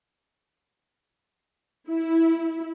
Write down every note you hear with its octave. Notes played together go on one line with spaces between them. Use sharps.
E4